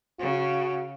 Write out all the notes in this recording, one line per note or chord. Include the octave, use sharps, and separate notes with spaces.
C#3 F#4